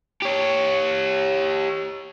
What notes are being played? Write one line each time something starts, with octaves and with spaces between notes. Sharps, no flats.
G4 C#5